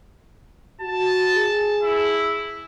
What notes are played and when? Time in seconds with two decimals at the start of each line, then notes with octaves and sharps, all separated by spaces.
0.81 F#4 A5
1.36 G#4
1.83 E4